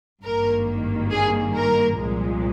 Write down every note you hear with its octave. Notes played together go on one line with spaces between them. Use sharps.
G#1 G2 D#3 A#3 A#4
G#4
A#4
C2 A#2 F3 G#3